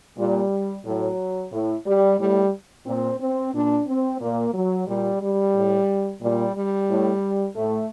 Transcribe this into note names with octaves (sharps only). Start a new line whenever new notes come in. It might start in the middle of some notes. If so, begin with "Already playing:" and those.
A#2 G3
A2 F#3
A2
G3
A2 G3
A#2 C4
C4
A#2 D4
C4
A#2 A#3
F#3
A#2 G3
G3
A2
A#2 G3
G3
A2
A2 A3